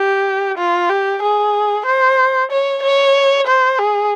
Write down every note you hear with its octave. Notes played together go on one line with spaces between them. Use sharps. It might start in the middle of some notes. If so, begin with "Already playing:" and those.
Already playing: G4
F4
G4
G#4
C5
C#5
C#5
C5
G#4